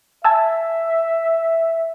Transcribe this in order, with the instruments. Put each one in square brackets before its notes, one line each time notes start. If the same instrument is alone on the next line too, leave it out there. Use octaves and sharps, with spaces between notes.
[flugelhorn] E5 [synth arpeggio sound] G#5 A5 E6